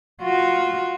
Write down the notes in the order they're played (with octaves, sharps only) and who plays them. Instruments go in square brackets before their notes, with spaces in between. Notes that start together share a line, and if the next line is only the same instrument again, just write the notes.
[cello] F4 F#4